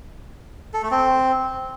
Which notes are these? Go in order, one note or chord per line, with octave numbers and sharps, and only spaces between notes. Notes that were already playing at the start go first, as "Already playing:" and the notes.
A4
A3
C4